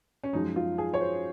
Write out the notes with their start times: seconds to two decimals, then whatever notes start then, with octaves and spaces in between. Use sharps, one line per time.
0.24 C#4
0.33 F#2 F3 G#3 D#4
0.56 F4
0.78 G#4
0.94 C#5
1.00 C5